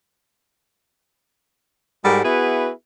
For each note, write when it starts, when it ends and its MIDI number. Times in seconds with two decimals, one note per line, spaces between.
2.04 2.22 44
2.04 2.22 55
2.04 2.22 56
2.04 2.22 66
2.04 2.22 69
2.04 2.22 70
2.24 2.69 59
2.24 2.69 64
2.24 2.69 66
2.24 2.69 68
2.24 2.69 71
2.24 2.69 76